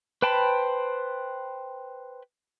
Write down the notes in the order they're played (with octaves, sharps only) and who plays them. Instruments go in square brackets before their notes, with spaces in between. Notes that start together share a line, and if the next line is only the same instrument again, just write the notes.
[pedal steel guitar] B4 C5 G5 A5 B5